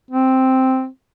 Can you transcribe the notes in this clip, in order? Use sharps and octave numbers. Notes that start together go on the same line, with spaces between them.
C4